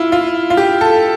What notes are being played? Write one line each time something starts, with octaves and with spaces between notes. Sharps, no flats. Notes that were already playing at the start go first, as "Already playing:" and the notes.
Already playing: E4 F4
F4
F4
G4
A4